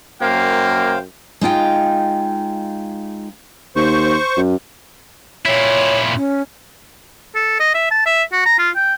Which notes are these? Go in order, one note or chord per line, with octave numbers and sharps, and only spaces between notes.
F#2 A#3 C5 F5 G5
G#3 D#4 F4 G5
D#2 C5 C#6
F#2
A#2 E4 C#5
C#4
A4
D#5
E5
A5
E5
F#4
A#5
F4
G5